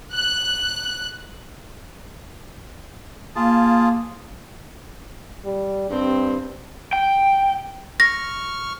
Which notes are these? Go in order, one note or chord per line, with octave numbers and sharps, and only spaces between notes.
F#6
A#3 F4 G#4 A5
G3
G2 C4
G5
C#6 F6 A#6